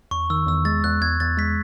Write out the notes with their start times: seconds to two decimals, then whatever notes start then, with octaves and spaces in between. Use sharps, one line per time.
0.11 E2 C#6
0.30 D#3 E6
0.47 E2 E6
0.65 G#3 A6
0.84 E2 F#6
1.01 E2 G#6
1.20 E2 A6
1.38 G#3 B6